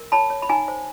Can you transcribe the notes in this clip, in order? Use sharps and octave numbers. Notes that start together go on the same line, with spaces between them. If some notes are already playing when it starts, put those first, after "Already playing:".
Already playing: A#4
C#5 A5 B5
C#5
B5
D#4 G#5 A#5
C5